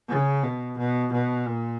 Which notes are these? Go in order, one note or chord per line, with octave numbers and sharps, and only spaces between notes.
C#3
B2
B2
B2
A#2